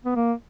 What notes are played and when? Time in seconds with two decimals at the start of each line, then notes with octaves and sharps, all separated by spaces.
0.05 B3
0.16 A#3